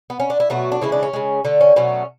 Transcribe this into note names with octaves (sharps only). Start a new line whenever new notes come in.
B3
C#4
D4
E4
B2 F#3 A3 F#4
D4
C#3 E3 G#3 E4
D4
C#4
C#3 G#3
D3 A3
C#4
B2 F#3 A3 C#4